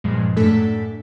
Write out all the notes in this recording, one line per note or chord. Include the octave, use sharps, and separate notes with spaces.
G2 A#2 F3 G#3
F#2 A2 A3 D4 A4 B6